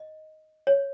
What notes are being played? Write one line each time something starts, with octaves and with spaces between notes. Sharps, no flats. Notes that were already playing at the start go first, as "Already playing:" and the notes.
Already playing: D#5
C#5